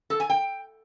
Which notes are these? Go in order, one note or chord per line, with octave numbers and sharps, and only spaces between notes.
A4
G#5
G5